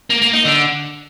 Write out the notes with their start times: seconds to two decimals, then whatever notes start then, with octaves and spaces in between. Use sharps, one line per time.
0.10 A#3
0.22 A#3
0.33 D#4
0.45 D3